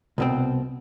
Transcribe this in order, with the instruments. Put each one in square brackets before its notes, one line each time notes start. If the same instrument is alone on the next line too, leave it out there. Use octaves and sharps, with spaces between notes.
[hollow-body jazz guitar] C2 B2 C4